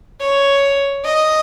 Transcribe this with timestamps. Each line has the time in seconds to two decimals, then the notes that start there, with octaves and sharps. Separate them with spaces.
0.21 C#5
1.05 D#5